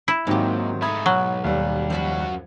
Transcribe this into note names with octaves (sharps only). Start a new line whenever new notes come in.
E4
D#2 G#2 D#3 F#3 C4 G4
A3 D#4 B5 D#6 G#6
B1 F#3
D#2 G3
F#2 F3 F#4 F#5 B5